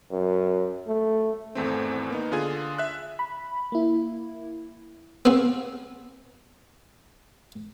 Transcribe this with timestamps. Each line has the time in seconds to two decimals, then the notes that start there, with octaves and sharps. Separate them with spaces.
0.11 F#2
0.87 A3
1.55 G#1 E2 A3 C4
2.10 A#3 B3 D#4
2.32 D3 F4 G#4 G#5
2.78 E5 F#6
3.19 B5
3.72 A#3 E4
5.25 B3 C4 G#4